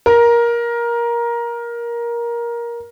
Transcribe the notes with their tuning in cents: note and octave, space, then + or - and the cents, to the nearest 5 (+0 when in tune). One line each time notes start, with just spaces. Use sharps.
A#4 +15